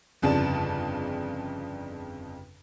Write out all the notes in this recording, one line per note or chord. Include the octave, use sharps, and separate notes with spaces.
G1 F2 C#3 D4 A5